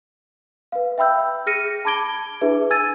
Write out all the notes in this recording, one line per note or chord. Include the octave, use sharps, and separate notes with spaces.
B4 F5
E5 G5 B5 E6 G6
G#4 F6 A#6 C#7 D#7
A5 B5 D6 G#6 D7 G7
D4 E4 G#4 B4 E5
G#5 E6 G#6 A6 D#7